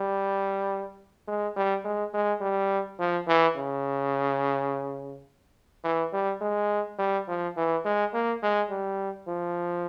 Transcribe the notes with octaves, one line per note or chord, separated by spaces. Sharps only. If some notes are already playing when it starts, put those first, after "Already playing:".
Already playing: G3
G#3
G3
G#3
G#3
G3
F3
E3
C#3
E3
G3
G#3
G3
F3
E3
G#3
A#3
G#3
G3
F3